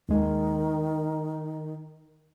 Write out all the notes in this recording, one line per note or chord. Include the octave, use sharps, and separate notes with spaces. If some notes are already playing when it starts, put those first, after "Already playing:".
D#2 D#3 G#3